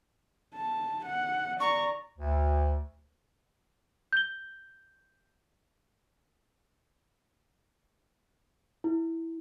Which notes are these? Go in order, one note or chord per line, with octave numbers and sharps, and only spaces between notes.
A5
F#5
D5 A#5 C#6
D2
G6 G7
E4